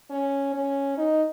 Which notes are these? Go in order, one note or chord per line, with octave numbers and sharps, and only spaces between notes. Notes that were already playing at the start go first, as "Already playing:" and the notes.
C#4
C#4
D#4